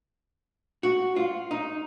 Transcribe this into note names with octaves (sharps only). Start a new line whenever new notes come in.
F#4
F4
D#4